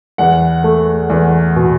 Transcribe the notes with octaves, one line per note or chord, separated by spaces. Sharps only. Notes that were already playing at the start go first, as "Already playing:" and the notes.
E2 F#5
A3
E2
B2